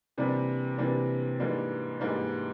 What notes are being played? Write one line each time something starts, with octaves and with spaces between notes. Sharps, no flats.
C3 E3 G3 A#3 D4
C3 E3 G3 A#3 D4
G#2 E3 G3 A#3 D4
G#2 E3 G3 A#3 D4